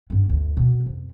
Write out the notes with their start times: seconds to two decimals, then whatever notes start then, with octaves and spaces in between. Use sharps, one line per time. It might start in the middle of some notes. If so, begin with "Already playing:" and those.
0.10 G2 B3
0.29 D2
0.57 B2
0.86 F2